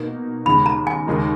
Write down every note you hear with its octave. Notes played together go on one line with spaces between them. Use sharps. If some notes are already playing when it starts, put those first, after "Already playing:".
Already playing: B2 A#3 D#4
D#2 C#3 G#3 B5
A#5
G#5
D#2 C#3 G#3 D#4 A#4